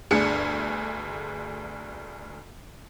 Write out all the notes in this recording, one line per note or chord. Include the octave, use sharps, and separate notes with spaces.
G1 D2 D4 G#4 C#7